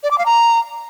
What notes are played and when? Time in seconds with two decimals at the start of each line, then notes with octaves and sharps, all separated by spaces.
0.03 D5
0.11 D6
0.18 F5
0.26 A#5